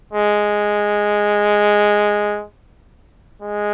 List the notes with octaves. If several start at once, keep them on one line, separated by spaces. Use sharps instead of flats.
G#3
G#3